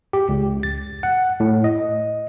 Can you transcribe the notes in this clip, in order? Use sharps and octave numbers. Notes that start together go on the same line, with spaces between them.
G4
C#2
A6
F#5
A2
D#5